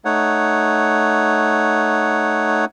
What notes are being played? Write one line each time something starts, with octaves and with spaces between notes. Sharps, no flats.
A3 D#4 C#5 F#5